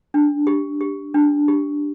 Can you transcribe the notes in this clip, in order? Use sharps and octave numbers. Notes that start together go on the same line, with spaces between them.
D4
G4
G4
D4
G4